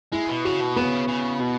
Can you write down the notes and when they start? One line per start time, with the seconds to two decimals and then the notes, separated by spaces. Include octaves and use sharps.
0.12 G#3 E4
0.29 B2
0.45 C#3 F#4
0.61 B2
0.76 C#3 B3
1.08 C#3
1.41 B2